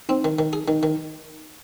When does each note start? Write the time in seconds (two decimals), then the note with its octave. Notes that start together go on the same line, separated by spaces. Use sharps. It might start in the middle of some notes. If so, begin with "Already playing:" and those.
0.09 C4 D#4
0.24 D#3
0.39 D#3
0.53 G#4
0.68 D#3 D#4
0.83 D#3